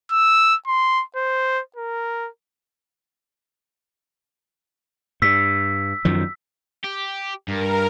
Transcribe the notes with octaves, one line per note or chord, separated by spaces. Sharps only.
E6
C6
C5
A#4
G2 E6 B6
F#2 D#3 F3
G4
G2 A#4